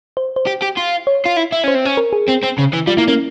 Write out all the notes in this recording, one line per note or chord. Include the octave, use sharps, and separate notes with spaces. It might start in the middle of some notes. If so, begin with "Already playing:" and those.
C5
C5
G4
G4
F4
C#5
F4
E4
E4
C#4 C5
C4
C#4
A#4
G#4
C4
C4
C#3
E3
G3 F4
A#3 E4
A#3 C#4